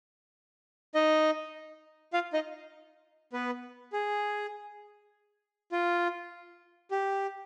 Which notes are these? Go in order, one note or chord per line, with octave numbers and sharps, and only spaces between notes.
D#4 D#5
F4 F5
D#4 D#5
B3 B4
G#4
F4
G4